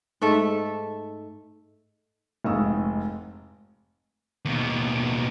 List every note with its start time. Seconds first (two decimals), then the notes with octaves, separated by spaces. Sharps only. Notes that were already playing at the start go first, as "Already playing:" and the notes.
0.21 G#2 A3 A4 E5
2.44 F1 G#2 F5 C#6 D#6 E6
4.45 D#2 B2